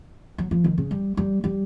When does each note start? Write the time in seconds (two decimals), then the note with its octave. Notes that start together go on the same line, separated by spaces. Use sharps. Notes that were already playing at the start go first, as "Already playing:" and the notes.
0.38 F#3
0.51 F3
0.64 D#3
0.78 C#3
0.91 G3
1.17 G3
1.44 G3